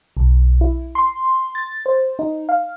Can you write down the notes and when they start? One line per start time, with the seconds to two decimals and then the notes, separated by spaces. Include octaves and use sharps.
0.17 B1
0.61 E4
0.95 C6
1.55 A6
1.86 C5
2.19 D#4
2.49 F5